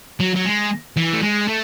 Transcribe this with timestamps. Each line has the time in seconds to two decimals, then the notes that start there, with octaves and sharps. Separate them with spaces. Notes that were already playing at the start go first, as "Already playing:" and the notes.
0.20 F#3
0.36 F#3
0.46 G#3
0.97 E3
1.13 A3
1.22 G#3
1.48 A3